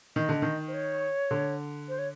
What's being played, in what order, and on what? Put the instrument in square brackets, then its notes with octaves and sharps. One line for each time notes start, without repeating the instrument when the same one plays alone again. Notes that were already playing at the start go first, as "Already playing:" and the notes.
[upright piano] D#3 [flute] D#5
[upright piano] D3
D#3
[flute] C5
C#5
[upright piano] D3
[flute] C5
C#5